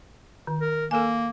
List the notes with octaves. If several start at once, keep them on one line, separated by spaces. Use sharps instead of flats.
D#3
A#4
A#3 A4 A#4 G#5